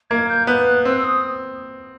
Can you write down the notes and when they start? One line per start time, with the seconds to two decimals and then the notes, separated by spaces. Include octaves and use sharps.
0.10 A#3 G#6
0.29 G6
0.47 B3 F#6
0.66 F#6
0.85 C4 E6
0.97 E6
1.04 D#6